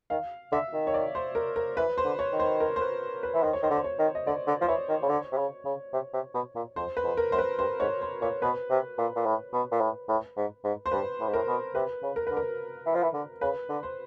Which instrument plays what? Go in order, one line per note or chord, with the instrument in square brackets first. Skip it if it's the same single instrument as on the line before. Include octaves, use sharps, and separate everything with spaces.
[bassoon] D#3 [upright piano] F5
[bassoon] D3 [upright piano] E5
[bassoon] D#3
[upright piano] C#5
D5
C5
A#4
A#4
[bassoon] E3 [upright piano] B4
[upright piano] C5
[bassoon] D3
[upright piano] C#5
[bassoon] D#3
[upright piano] C5
A#4
C5
B4
B4
[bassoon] E3
[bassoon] D#3 [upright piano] C5
[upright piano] C#5
[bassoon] D#3 [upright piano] C5
[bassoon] D3
[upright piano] C5
C#5
[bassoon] D#3
[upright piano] D#5
[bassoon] D3 [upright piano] D5
[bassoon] D3
[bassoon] F3 [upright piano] C5
[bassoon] E3 [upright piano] C#5
[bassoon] D#3
C#3
D3
C3
C#3
C#3
C3
C3
B2
A#2
[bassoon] F2 [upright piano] C5
[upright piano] B4
[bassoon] F2
[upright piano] A#4
[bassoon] F#2 [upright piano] C5
[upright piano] B4
[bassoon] G2 [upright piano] C5
[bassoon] G#2 [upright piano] C#5
[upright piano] C5
[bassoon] A#2 [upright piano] C#5
[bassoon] B2 [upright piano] B4
[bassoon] C3
A#2
A#2
A2
B2
A#2
A2
A2
G#2
G#2
[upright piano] C5
[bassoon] G2 [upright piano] B4
[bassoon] A2
G#2
[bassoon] A2 [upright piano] A#4
[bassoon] B2
[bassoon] C3 [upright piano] B4
[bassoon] C#3
[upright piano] A#4
[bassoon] D3 [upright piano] B4
[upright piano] A#4
[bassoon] E3
F3
E3
D3
[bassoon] C#3 [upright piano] B4
[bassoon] D3
[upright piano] C5